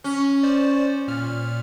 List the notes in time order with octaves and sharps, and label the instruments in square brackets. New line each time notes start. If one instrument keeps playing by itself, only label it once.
[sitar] C#4
[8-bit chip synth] C5 D5
A#2 F6